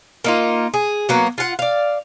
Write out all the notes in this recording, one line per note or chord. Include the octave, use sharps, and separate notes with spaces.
A#3 D#4 F4
G#4
F#3 A#3 B3
F4 F#5
D5 F5